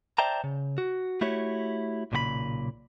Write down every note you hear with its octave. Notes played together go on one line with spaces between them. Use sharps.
C5 D5 E5 G5 A5 A#5
C#3
F#4
A3 E4 F#4 G4 C#5
B1 A#2 C#3 G4 B5